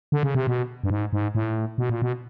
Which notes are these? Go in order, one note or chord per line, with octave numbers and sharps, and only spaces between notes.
D3
C#3
C3
B2
G2
G#2
G#2
A2
B2
A#2
B2